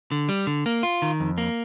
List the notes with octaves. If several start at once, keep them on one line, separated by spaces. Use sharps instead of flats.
D3
G3
D3
A#3
F4
D#3
F2
A#3